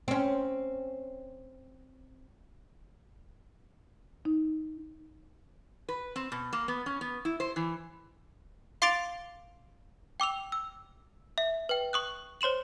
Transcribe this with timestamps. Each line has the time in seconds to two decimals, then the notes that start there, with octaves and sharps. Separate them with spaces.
0.08 C4 C#4
4.25 D#4
5.89 B4
6.16 C4
6.32 B2
6.53 A#3
6.68 B3
6.86 C#4
7.01 B3
7.25 E4
7.40 C5
7.56 E3
8.82 F5 C6 D6 A6 D7 F7
10.20 G5 D6 E6 F7
10.52 E6
11.38 E5
11.69 B4 G5
11.93 C#6 D#6 F#6
12.41 C5 C#5 C6 E7 F#7